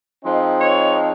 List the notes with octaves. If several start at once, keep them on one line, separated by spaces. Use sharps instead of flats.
F3 G#3 C4 D#4
C#5